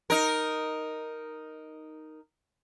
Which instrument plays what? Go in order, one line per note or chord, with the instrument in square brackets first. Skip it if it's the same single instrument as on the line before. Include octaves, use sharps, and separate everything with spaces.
[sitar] D#4 A#4